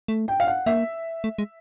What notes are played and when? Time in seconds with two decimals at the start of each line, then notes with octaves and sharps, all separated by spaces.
0.08 A3
0.28 G5
0.40 F5
0.47 F#5
0.66 A#3 E5
1.24 A3
1.38 G#3